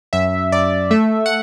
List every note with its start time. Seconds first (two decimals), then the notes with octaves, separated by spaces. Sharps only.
0.13 F#2 E5
0.52 F#2 D5
0.91 A3 E5
1.26 F#5